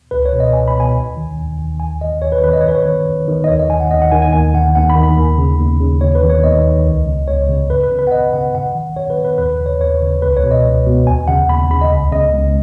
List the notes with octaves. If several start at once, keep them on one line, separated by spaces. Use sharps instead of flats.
C#2 B4
C#5
B2
D#5
C#2 G#5
B5
B2 G#5
D#2
D#3
D#2
D#3
D#2 G#5
D#3 D#5
D#2 C#5
B4
C#5
D#3 B4
D#5
C#5
F#2 B4
C#5
D#3
F#2
D#3
D#5
D#2 C#5
D#5
D#3 G#5
F#5
D#2 D#5
F#5
D#3 G#5
G#5
D#2 G#5
D#3 F#5
D#2 F#5
B5
D#3
B5
D#2
C#3
D#2
C#3
D#2 C#5
B4
D#3
C#5
D#2 D#5
D#3
C#2
C#3
C#2 C#5
C#3
F#2 B4
B4
C#3
B4
F#5
F#2 D#5
C#3 F#5
F#2 F#5
D#3
F#2 C#5
B4
D#3
B4
D#2 B4
C#3
C#5
D#2 C#5
C#3
C#2 B4
C#5
B2
D#5
C#2
B2
D#2 G#5
C#3 F#5
D#2 B5
C#3 B5
D#5
C#2
C#3 D#5
C#2